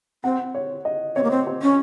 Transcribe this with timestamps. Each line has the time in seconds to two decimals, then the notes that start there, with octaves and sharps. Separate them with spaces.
0.24 C4 F#5
0.55 C#5
0.85 D#5
1.16 C4 C#5
1.23 A#3
1.31 C4
1.47 C5
1.62 C#4